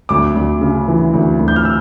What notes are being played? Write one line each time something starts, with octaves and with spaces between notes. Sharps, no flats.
D2 D6
D2
C#3
E3
D2
D2
G6
F6
E6